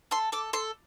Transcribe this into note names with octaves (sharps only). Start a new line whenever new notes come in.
A4 C6
A4 D6
A4 C6